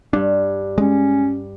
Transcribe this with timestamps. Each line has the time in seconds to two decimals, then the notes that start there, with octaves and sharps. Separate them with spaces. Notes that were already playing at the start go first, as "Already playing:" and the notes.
0.13 G2 D4
0.78 G#3 C#4